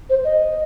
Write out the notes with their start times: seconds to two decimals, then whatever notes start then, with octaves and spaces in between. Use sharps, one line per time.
0.09 C5
0.24 D#5